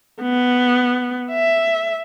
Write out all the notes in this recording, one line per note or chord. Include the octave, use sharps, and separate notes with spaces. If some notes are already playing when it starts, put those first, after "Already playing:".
B3
E5